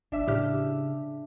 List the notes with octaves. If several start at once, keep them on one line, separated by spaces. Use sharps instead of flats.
G1 D4 E5
A2 C#3 G4 F6